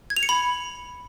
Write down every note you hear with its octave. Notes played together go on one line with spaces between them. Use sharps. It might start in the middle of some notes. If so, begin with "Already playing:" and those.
G#6
F7
C#7
B5